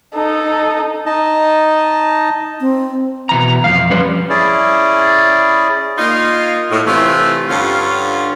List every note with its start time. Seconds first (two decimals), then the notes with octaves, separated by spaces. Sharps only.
0.15 D#4 A4
1.06 D#4 D#5 A5
2.61 C4
3.29 B2 E3 A#5
3.64 F2 F3 F5
3.90 F3 G3 C#4 B4 C5
4.29 C#4 E4 G#4 D5
5.98 A#3 D#4 F4
6.71 A2
6.87 A2 C3 E3 A3 F4 C#5
7.49 G2 D3 C#4 F4